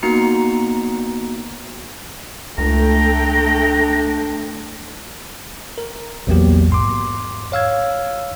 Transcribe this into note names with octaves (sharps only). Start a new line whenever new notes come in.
A#3 B3 D#4 F#4 A#5 C#7
C#2 A3 D4 G5 A#5
A#4
A#1 E2 F#3 A#3 B3 G4
G#2 C6 D6
C#5 F5 E6 G#6